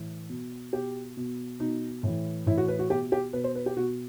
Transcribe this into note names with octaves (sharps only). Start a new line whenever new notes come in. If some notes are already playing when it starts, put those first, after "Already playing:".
Already playing: A2 E3
B2
B2 G4
B2
B2 D#4
A2 E3
A2 E3 E4
F#4
B4
F#4
B2 G4
G4
B2 B4
C5
B4
G4
B2 F#4